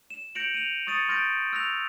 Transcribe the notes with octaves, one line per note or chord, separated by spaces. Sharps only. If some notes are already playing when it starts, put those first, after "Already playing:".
E7
G6 A#6 C#7 D7 F7 F#7
D#7 F7
C#6 D#6 A6 C#7 D#7
C6 F6 G6 A6 A#6 D7
E6 F#6 A#6 F7